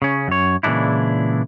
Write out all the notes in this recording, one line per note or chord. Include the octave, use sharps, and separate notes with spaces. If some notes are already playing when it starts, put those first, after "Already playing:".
C#3 C#4
F#2 C#5
A#2 C#3 E3 G#3 D4 E4